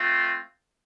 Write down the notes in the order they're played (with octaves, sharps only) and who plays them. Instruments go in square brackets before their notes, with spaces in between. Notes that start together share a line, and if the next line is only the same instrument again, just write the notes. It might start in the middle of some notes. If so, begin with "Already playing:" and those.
Already playing: [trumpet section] A3 C4 F4